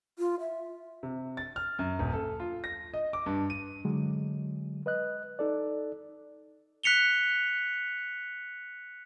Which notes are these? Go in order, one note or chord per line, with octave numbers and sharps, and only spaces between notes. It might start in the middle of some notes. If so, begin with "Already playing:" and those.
F4
E5
C3
A6
F6
F#2
D#1
A4
F4
A#6
D#5
D6
G2
D#7
D3 F#3 G#3
B4 D#5 F#6
D#4 A4 D5
F#6 B6 C#7 F7 G7